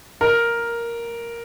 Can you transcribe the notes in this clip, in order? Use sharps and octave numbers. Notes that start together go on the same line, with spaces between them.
A#4